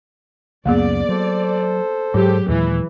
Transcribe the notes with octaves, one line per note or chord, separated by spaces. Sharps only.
C#2 F#2 A#3 B3 G#4 D5
F#3 A4 C5
G#2 F#3 G4 G#4
D#2 A#2 E3 G#3